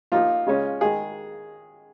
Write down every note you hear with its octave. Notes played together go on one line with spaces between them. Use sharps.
F3 A#3 D#4 F4
C#3 G#3 C#4
D#3 G#3 G#4